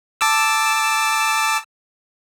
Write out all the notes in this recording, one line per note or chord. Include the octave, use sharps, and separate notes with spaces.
A5 D6 E6